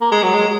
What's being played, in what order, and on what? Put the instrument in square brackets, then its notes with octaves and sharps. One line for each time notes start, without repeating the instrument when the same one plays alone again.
[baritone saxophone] A#3
G#3
F#3
G#3